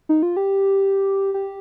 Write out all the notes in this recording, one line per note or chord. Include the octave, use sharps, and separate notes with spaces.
D#4
F4
G4
G4